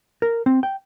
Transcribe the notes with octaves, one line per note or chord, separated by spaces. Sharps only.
A#4
C4
G5